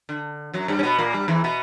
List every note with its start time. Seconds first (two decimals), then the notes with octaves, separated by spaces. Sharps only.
0.09 D3
0.53 F#2 F#3
0.68 G2 G3
0.79 C#4
0.83 B2 B3
0.99 A#2 A#3
1.13 G2 G3
1.28 E2 E3
1.44 B2 B3